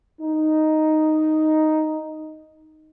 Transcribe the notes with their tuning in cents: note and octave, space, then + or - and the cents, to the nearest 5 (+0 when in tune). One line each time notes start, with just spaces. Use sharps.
D#4 +0